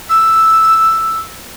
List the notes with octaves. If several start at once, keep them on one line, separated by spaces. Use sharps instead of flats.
E6